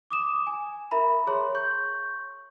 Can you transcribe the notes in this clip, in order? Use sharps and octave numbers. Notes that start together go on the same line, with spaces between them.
D6 D#6 E7
G#5
A#4 E5 A#5 B5
G#4 C#5 A#5 C6
C#6 G6